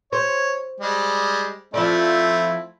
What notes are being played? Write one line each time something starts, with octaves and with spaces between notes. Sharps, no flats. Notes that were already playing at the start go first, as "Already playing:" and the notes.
C5 C#5
G3 G#3
F3 A3 C4 E4 D5